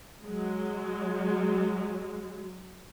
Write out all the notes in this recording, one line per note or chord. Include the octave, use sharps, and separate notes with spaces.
F#3 G#3